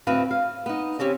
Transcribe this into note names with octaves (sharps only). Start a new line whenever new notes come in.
D2 A2 C4 B4 F5
F5
B3 D#4
C#3 C4 C#4 G4